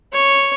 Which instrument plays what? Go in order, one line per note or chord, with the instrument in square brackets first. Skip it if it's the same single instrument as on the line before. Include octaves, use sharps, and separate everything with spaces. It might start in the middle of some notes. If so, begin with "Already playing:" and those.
[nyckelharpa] C#5